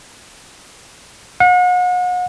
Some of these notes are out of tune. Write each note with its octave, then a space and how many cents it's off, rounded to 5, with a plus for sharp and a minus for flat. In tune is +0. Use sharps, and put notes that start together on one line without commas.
F#5 -40